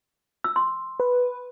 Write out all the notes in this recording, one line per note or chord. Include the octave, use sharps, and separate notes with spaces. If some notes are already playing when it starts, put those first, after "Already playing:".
E6
C6
B4